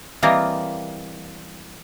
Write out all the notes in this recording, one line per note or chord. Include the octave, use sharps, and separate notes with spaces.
E3 G3 A#3 C4 F4 D#5